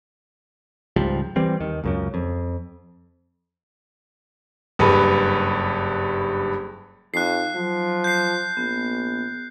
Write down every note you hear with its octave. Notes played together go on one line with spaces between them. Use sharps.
C#2 G#2 F3 G3
E3 G3 C4
D#2 D#3
C#2 F#2 C#3
F2
F#1 G2 B4
F2 D#4 F5 F#6 C7
F3 F#3
G6 C7
A#1 B3